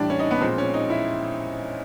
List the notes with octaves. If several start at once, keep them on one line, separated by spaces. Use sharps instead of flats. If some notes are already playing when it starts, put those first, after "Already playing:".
Already playing: A2 E3 G3 D4
C#4
D#4
B3
A#2 F3 G#3 C4
C#4
D#4
E4